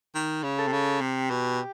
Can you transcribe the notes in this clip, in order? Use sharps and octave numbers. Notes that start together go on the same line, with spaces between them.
D#3
C#3
A4
C3
C#3
C3 G4
B2